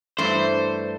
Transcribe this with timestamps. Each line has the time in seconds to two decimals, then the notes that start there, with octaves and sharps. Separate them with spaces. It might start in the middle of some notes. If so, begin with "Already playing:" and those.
0.18 G2 E3 A3 C5